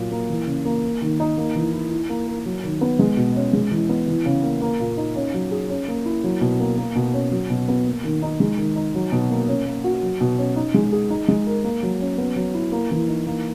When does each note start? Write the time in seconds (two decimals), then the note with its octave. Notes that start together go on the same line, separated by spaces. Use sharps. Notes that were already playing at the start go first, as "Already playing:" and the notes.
Already playing: A#2 F#3
0.11 A#3
0.29 E3
0.47 C#3
0.65 A#3
0.83 A#3
1.01 D#3
1.20 D#4
1.38 A#3
1.55 E3
1.73 E4
1.91 E4
2.09 A#3
2.27 A#4
2.46 F#3
2.64 D#3
2.81 B3
2.99 G#3
3.17 B2
3.36 C#4
3.53 G#3
3.71 E3
3.89 B3
4.07 E3
4.26 C#3
4.43 A#3
4.62 A#3
4.80 A#2
4.97 D#4
5.16 C#4
5.34 F#3
5.51 G#4
5.70 C#4
5.88 A#3
6.06 E4
6.24 F#3
6.41 B2
6.60 A#3
6.78 A#3
6.96 B2
7.13 C#4
7.31 F#3
7.50 B2
7.68 B3
7.86 A#3
8.04 D#3
8.22 D#4
8.40 G#3
8.58 D#3
8.76 D#4
8.95 F#3
9.12 B2
9.30 A#3
9.48 C#4
9.66 A#3
9.84 F#4
10.02 F#3
10.21 B2
10.38 C#4
10.56 D#4
10.74 G#3
10.92 G#4
11.10 D#4
11.28 G#3
11.46 A#4
11.64 A#3
11.83 F#3
12.01 C#4
12.18 B3
12.36 F#3
12.54 E4
12.72 A#3
12.91 E3
13.08 D#4
13.26 A#3